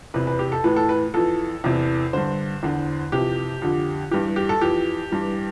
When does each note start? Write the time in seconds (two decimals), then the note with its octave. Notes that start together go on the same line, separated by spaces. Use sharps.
0.14 E2 C3 E3 B4
0.27 B4
0.39 G4
0.52 A4
0.64 A2 E3 B4
0.76 A4
0.89 B4
1.14 F2 E3 A4
1.64 E2 C3 E3
2.13 G2 D3 C5
2.63 E2 D3
3.12 F2 C3 E3 G4
3.62 F2 D3
4.11 G2 E3 G4
4.36 G4
4.49 A4
4.61 F2 E3 G4
5.12 G2 E3